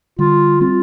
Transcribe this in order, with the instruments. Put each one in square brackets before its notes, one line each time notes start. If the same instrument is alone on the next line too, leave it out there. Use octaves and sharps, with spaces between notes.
[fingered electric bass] D3 G3 [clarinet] F4
[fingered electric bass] G3 C4 [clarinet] F4